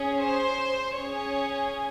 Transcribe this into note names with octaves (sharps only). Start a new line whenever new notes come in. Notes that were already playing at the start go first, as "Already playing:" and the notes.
Already playing: C#4 G#4
C5
C#4 G#4 C#5